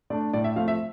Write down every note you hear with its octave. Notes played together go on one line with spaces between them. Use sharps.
A3 D4 D5
A2 D5
E5
F3 A3 C4 F4 F5
E5